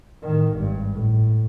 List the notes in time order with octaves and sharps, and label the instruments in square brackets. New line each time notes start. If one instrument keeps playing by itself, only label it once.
[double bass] A2 D#3
G#1 G2
A2